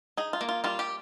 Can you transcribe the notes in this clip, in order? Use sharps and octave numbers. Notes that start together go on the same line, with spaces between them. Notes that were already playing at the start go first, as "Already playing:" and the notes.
D#4 G#4
F4
A#3
F4
G3 F4
G4